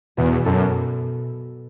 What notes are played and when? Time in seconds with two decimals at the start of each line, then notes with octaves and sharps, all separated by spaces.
0.17 E2 B2
0.45 F#2 A4